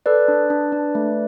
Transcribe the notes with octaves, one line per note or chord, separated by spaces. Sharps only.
A4 B4 D5
D4
D4
D4
A3